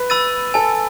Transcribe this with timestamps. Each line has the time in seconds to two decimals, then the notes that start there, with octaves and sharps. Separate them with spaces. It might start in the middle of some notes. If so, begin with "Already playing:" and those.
Already playing: B4
0.10 B5 E6 A6 D#7
0.54 A4 G#5